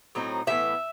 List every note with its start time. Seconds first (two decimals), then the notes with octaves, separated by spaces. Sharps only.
0.15 A2 F#3 C4 D#4
0.47 A2 E3 B3 E5